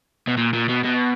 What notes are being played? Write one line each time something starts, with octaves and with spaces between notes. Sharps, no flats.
B2
A#2
A#2
B2
B2